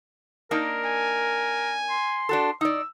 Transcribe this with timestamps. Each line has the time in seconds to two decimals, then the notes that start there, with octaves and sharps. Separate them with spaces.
0.51 A#3 D4 D#4 A#4
0.85 G#5
1.90 C6
2.29 D4 F#4 A4
2.61 D#4 D5 E6